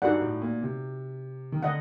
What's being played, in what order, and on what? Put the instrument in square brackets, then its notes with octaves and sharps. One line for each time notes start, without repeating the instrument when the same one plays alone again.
[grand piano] G2 [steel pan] D#4 F#4 A4 D5 F#5
[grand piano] A2
A#2
C3
D#3
[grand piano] D3 [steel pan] D#5 F#5